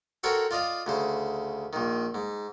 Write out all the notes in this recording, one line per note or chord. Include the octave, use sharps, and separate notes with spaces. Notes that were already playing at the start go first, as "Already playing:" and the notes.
F#4 A4 A#4 C5 C#5 G5
F4 D5 D#5 F5
D2 C#3 C5
A#1 D#3
G#2